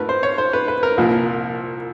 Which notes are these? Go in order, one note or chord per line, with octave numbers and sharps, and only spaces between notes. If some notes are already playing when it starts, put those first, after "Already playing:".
Already playing: G#2 F3 A3 A#4 B4
C5
C#5
C5
B4
B4
A#4
C2 A#2 F3 A#3